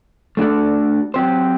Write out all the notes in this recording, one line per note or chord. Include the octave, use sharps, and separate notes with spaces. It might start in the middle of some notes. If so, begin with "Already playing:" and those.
A3 D4 F#4 A4 D5
F#3 C4 G4 C5